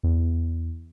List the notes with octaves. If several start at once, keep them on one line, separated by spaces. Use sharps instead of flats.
E2